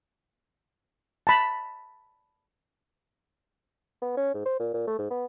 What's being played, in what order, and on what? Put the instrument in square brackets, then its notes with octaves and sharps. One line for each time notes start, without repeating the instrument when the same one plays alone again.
[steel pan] A5 B5
[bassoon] B3
C#4
G#2
C5
A#2
A#2
A3
G#2
B3